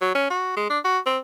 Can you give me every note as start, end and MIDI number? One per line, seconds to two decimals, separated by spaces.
0.01 0.11 54
0.15 0.26 61
0.31 0.53 66
0.57 0.69 56
0.70 0.79 62
0.85 0.99 66
1.06 1.19 60